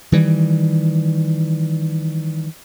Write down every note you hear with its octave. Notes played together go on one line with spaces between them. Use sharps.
D#3 E3 G3